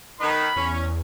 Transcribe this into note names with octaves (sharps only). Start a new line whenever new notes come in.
D#3 D#4 B4 B5
E2 C#4